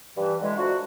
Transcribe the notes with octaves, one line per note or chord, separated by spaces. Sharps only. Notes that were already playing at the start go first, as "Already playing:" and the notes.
G2 E3
D3 E3 G#3
F3 F#3 A3 D4 F#4